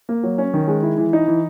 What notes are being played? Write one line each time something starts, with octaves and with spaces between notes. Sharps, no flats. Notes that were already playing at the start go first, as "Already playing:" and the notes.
A#3
F#3
C#4
D#3
G#3
E4
E3
D#4
E3